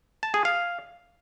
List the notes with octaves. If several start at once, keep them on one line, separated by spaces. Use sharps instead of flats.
A5
G#4
F5